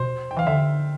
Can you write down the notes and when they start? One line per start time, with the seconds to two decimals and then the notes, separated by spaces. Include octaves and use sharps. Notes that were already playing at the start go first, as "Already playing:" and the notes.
Already playing: B2 C5
0.31 G5
0.37 E3 F5
0.46 D3 E5